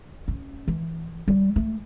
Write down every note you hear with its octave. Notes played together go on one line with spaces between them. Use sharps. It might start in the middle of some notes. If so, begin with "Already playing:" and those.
C#4
E3
G3
A3